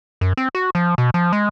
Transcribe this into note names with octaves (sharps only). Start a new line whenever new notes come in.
F#2
C4
F#4
F3
B2
F3
G#3